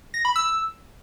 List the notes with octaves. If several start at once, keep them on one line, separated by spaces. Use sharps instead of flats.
A#6
B5
E6